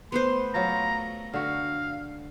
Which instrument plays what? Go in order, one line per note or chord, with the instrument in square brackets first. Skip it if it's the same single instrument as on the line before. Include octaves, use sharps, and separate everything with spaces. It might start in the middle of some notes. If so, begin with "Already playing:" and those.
[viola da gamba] A3 [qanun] B3 B4 C5 [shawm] C6
[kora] F#3 F4 [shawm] A#5
[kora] D3 F#4 [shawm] F5